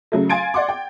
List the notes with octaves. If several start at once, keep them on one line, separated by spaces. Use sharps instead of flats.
C#3 F#3 A3
F5 G#5 C6 G#6 A6 D7
D5 F#5 C6 D6
G5